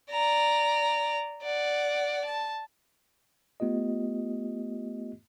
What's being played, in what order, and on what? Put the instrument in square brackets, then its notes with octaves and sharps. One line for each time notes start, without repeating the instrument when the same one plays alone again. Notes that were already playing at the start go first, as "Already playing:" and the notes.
[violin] D5 A#5
D5 F#5
A5
[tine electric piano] A3 B3 F4 G4 D#5